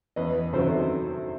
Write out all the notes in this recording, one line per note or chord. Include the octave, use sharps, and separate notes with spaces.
E2 B4 D#5
C3 D#3 F#3 A4 C5